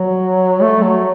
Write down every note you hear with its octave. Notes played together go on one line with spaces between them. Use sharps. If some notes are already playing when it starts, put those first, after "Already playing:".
Already playing: F#3
A3
F#3